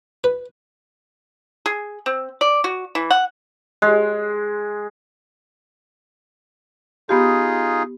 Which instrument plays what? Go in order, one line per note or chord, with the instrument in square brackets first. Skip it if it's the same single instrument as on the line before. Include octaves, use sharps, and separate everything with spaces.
[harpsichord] B4
[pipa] G#4
C4
D5
F#4
E3
F#5
[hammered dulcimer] G#3
[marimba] B3 G4 [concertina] D#4 F4 G#4